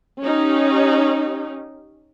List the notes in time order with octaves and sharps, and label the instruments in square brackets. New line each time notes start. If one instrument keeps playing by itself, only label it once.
[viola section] C#4 D#4 G4